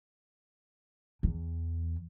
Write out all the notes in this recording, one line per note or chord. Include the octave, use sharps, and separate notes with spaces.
E2